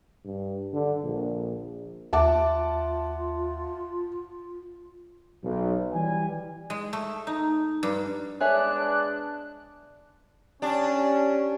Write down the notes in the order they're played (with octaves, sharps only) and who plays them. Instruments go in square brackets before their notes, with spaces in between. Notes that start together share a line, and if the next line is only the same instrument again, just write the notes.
[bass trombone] G2
D3
A#1
[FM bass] D#2 [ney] F4 [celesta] E5 [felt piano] F#5 A5 D6
[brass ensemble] B1
E3 G3 G#5
[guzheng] G#3
A3
D#4
G2
[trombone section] G#3 B3 D4 [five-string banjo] G#4 C#5 E5 [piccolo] F#6
[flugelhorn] C#4 [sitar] D4 [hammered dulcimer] G4